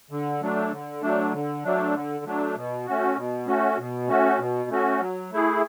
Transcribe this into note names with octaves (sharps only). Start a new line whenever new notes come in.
D3
F#3 A3 D4
D3
F#3 A3 D4
D3
F#3 A3 D4
D3
F#3 A3 D4
B2
A3 C#4 F#4
B2
A3 C#4 F#4
B2
A3 C#4 F#4
B2
A3 C#4 F#4
F#3
A3 E4 G#4